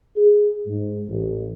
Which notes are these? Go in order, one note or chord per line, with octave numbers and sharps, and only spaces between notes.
G#4
G#2
A1